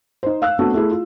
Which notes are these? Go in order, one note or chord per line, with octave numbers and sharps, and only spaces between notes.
D#4 C5
F5 E6 F#6
A3 B3 C4 D4 F#4
A3 E4 G#4
F4